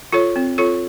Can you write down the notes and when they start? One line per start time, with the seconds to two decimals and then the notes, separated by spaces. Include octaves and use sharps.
0.13 F4 A4 C#5
0.36 C4
0.58 F4 A4 C#5